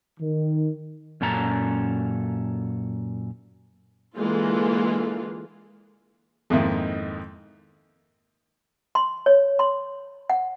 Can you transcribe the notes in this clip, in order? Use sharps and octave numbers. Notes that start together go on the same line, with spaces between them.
D#3
F#2 A#2 C#4 A4 A#5
D3 E3 G#3 A#3 F4
F2 G#2 D#3 A#3 E4 E5
C6
C#5
C6
F#5